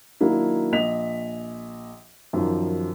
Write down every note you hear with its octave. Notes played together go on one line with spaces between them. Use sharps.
D#3 F#3 A#3 D4 E4
A#1 D#5 B6 F7
F#2 D#3 F3